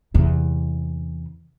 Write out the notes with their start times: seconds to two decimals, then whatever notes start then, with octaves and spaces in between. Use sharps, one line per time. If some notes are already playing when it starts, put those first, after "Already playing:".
0.14 E2 C3